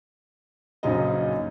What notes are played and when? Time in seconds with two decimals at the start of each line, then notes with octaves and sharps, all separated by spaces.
0.83 A#1 F#2 C#3 C#4 D#4 D#5